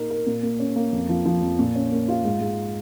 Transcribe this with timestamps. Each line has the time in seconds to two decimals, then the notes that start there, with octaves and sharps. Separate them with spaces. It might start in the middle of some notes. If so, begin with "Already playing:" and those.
Already playing: A#2 D#4 A#4
0.10 A#4
0.27 A#2
0.43 A#3
0.60 C#4
0.76 A#3
0.93 F2
1.09 F3
1.26 F3
1.42 F2
1.59 A#2
1.75 C#4
1.92 A#3
2.08 F4
2.24 G#2
2.41 G#2